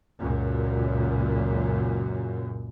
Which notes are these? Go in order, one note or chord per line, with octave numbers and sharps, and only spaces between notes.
C#2 F#2 A#2